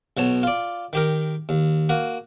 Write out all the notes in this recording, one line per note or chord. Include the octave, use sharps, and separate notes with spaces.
B1 B2 C#5 A5
F4 D5
D#3 G4 A#4
D#2
A#3 F#4